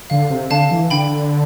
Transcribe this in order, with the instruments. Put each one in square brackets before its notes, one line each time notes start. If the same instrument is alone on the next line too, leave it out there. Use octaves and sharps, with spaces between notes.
[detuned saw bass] D3 [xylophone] F5
[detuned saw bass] C3
[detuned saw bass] D3 [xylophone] F5 A5
[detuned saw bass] E3
[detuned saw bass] D3 [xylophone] G5 B5